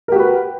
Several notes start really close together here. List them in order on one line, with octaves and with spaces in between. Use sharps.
A#4 G4 F#4 B4